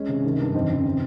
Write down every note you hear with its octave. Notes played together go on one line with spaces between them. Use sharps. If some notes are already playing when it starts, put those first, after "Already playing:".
Already playing: G#3 C#4
C3
D#3
G2
F2 C4 D#4
C#3
C3